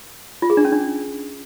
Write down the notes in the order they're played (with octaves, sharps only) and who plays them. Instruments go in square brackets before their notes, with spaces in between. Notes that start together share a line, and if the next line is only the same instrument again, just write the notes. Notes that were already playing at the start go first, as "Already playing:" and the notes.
[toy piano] F4
G#4
D4
C#4
D4